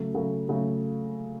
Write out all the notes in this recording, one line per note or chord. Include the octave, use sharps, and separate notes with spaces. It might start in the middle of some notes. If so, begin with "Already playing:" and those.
Already playing: C#3 F#3 A3
C#3 F#3 A3
C#3 F#3 A3